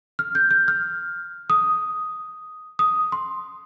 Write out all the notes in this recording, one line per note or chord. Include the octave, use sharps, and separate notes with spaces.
F6
G6
G6
F6
D#6
D#6
C6